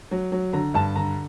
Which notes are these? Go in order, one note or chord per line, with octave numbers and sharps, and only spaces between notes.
F#3
F#3
D3 A#5
G2 A5
D3 A#5